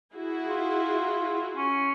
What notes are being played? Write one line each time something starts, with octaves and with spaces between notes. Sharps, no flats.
E4 F#4 G#4
F4
C#4